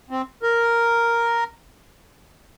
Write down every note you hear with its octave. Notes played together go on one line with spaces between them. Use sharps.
C4
A#4